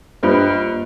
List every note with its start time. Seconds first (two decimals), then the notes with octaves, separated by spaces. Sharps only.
0.23 G2 A#3 F4 C5